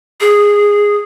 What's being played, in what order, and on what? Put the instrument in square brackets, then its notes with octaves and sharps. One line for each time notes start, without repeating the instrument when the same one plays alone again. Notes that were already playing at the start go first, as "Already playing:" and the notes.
[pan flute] G#4